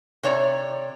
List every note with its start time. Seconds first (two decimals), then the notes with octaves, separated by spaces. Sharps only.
0.23 C3 C#5 D5 A#5